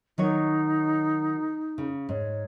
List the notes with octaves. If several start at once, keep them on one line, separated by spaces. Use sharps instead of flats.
D#3 F#3 D#4 C#5
C#3
G#2 C#5